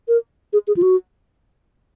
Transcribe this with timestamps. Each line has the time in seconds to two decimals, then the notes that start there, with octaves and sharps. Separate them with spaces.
0.08 A#4
0.53 G#4
0.67 G#4
0.77 F4
0.82 F#4